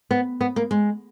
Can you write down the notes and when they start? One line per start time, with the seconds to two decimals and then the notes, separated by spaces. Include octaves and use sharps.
0.11 B3
0.41 B3
0.56 A#3
0.71 G#3